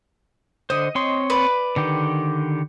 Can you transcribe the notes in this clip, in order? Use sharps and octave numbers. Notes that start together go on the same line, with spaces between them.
D3 C5 D#5
C4 C#5 C6
B4 D5
D3 D#3 G4